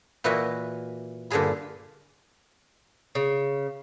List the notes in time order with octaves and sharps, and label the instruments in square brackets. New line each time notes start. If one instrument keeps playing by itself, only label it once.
[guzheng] A#2 E3 E4 F#4 D#5 E5
G2 A#2 D3 D4 G#4 B5
[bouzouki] C#3